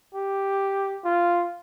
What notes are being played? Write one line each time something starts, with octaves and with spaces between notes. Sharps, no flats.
G4
F4